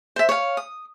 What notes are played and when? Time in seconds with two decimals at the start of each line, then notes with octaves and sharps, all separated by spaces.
0.16 C5 E5
0.29 C#5 F5
0.57 D#6